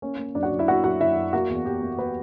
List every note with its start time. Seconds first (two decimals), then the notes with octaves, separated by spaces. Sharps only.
0.02 A#3 C#4 C#5
0.18 A#3
0.35 F#2 D4 D5
0.43 F#4 F#5
0.51 F#2
0.59 E4 E5
0.68 A#3 F#4 F#5
0.84 F#2 F#4 F#5
1.00 F#2 E4 E5
1.16 F#2
1.33 A#3 F#4
1.50 E2
1.65 E2 G4
1.82 A#3
1.98 A#3 B3 B4